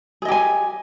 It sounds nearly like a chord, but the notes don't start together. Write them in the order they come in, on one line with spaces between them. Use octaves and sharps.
G#4 D#5 G4 G#5